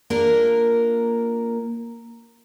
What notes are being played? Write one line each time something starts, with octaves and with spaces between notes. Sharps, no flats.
A#3 D4 F4 A#4